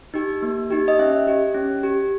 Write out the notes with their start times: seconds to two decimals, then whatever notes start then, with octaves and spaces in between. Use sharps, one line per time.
0.14 D#4 G4
0.42 A#3
0.70 D#4 G4
0.88 D#5
0.99 C#4 E5
1.28 G4
1.55 C#4
1.83 G4